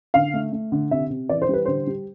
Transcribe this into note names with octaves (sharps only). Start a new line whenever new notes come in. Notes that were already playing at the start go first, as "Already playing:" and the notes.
D3 F5
A3
A3
D3
C3 E5
C3
E3 D5
C5
G3 B4
D3 C5
G3